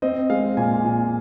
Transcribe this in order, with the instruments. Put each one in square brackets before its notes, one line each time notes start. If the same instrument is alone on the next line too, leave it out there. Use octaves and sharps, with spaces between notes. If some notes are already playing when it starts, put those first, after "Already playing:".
[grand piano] C4 D#5
G#3 F5
A#2 G#5
A#2